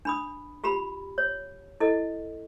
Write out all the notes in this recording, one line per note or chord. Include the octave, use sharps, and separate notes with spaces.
D4 B5 D#6
F4 G4 A#5 B5
C#5
E4 A4 D#5